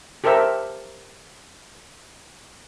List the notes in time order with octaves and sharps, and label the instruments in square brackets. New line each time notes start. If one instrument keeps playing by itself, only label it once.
[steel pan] G4 A4 A#4 C5 E5